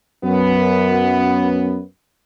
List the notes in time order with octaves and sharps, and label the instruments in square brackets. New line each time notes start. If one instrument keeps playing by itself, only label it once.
[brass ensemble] F#2 B3